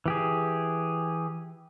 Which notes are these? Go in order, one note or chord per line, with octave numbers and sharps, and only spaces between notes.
E3 G4 G#4